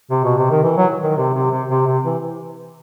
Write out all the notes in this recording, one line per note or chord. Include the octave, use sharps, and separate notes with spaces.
C3
B2
C3
D#3
E3
F#3
D#3
C3
C3
C3
C3
C3
E3